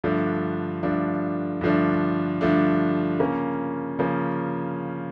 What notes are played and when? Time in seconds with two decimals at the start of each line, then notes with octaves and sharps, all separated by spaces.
0.04 G2 D3 F3 A3 D4
0.83 G2 D3 F3 A3 D4
1.61 G2 D3 F3 A3 D4
2.41 G2 D3 F3 A3 D4
3.19 C#3 F3 A#3 C#4
3.99 C#3 F3 A#3 C#4